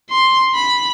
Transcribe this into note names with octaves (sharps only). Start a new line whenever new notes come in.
C6
B5